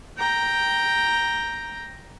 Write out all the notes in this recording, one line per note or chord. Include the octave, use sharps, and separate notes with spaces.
G5 A#5